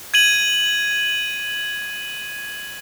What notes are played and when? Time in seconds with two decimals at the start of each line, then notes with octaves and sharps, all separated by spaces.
0.14 G#6 D#7 F#7